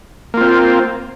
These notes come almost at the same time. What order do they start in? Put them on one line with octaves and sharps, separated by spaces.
A#3 F4 C4